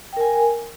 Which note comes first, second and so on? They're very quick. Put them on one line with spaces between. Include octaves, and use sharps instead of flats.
G5 A#4 G#5